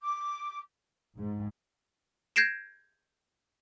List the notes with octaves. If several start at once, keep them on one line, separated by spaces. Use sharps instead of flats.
D6
G#2
G6 G#6 A#6 C7 D7 E7